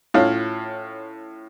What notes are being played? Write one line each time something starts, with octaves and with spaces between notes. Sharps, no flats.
A2 C#4 F4